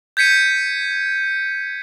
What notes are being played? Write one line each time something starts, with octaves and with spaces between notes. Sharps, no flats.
G6 G#6 B6 C#7 D#7